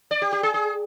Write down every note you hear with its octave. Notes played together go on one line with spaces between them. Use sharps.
D5
G4
G4
G#4
G#4